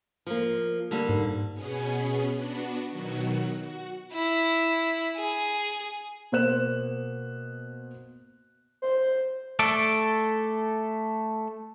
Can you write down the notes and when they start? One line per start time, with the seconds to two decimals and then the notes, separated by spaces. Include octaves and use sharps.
0.27 F3 A#3
0.91 D3 G3 A#3
1.09 G#2
1.53 B2 B3 C#4 G#4
2.36 B3 D4 F#4
2.90 B2 D#3 F#3 F#4
3.59 F#4
4.12 E4
5.17 G#4
6.32 B2 A#3 C5 F#6 E7
8.82 C5
9.59 A3 A4 D5